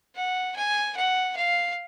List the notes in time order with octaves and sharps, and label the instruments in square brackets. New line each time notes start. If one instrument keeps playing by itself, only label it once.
[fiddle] F#5
G#5
F#5
F5